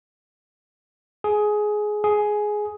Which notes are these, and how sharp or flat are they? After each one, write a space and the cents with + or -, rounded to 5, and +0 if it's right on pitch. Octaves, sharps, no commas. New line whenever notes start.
G#4 +15
G#4 +10